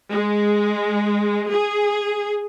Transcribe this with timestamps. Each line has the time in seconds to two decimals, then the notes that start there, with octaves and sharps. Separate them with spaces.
0.13 G#3
1.52 G#4